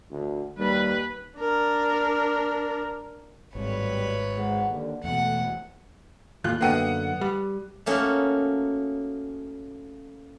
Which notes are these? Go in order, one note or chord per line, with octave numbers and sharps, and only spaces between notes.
D2
D#2 G3 B4
D4 A#4
G#1 A2 G3 B4 C#5
G#2 F#5
D#2 D3
E2 B2 A3 F#5
D#2 A2 F4 F#6
F#2 D3 A#3 B3 F#5 D#7
G3
A3 A#3 C#4 D#4 F#4